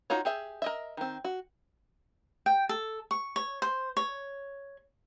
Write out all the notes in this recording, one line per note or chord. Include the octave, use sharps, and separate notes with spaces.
D#4 F4 F#4 C#5
G4 G#4 E5
A#4 D#5 E5
D#3 C4
F#4
G5
A4
C#6
C#5
C5
C#5